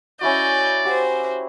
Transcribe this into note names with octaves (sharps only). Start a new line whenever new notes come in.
C#4 E4 F#4 D5 D#5 G6
F#4 G4 C5 F#5